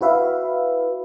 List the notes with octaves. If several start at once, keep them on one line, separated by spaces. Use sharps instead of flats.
E4 F#4 B4 E5 F5